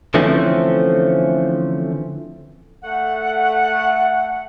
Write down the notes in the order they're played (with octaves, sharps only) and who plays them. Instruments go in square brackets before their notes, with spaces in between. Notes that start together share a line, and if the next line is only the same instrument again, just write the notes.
[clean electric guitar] D3 E3 F3 A3 C4 C#4
[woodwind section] A3 F#5